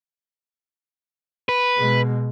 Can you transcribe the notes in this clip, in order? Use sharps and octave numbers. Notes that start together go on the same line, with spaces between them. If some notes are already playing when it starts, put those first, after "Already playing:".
B4
B2 G#3